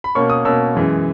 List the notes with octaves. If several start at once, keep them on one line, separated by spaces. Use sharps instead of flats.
B5
B2 A#3 C#4 C#6
D#6
B2 A#3 C#4 E6
F#2 E3 G#3